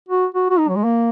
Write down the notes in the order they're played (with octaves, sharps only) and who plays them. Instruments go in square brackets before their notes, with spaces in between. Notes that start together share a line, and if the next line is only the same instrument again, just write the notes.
[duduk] F#4
F#4
F#4
D#4
F#3
G#3
A#3